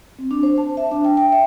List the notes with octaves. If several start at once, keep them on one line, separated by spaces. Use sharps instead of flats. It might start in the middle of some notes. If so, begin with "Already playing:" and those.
C4
D4
C5
A5
E5
D4
G5
G5
E5